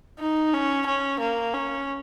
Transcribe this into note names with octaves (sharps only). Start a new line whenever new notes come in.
D#4
C#4
C#4
A#3
C#4